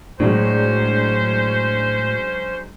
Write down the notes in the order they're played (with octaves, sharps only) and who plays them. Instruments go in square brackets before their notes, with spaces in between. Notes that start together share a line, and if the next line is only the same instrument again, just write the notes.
[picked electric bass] A2 [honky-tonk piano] F#3 G#3 D4 [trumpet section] C#4 C5